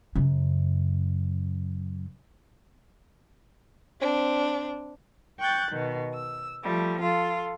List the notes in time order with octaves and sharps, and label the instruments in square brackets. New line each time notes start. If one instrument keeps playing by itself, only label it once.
[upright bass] F#2 C#3
[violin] C4 D4
[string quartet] G5 C#6 F#6 G6 A6
B2 D#3
E6
F3 G3 A3
F4 A4